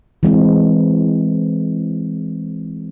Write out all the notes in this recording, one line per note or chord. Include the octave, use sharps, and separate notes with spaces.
E3 G#3 C4